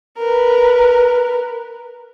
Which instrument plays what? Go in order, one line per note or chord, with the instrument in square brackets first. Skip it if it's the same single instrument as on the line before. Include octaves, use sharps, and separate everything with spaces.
[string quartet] A#4 B4